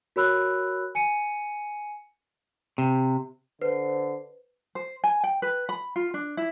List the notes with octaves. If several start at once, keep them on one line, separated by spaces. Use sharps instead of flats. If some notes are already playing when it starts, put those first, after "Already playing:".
F#4 A#4 C#5 B5 E6 F#6
G#5 C#7 D#7
C3
D3 B4 C5
C5
G#5
G5
B4
B5
F4
D4
E4